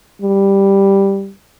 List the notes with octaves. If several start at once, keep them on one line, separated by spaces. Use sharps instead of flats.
G3